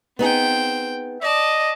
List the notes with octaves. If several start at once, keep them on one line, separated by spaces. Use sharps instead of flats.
B3 C4 D#4 G#4 G5
D5 D#5 A5